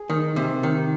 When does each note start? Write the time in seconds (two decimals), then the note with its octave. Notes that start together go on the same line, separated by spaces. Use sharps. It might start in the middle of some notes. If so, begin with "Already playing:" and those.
Already playing: G#4
0.10 D#3
0.36 C3
0.63 D#3